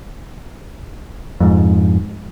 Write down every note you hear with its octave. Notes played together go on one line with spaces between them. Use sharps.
F2 G#2